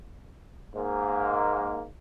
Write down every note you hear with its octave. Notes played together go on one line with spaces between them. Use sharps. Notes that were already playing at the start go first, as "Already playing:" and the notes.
G#2 A#3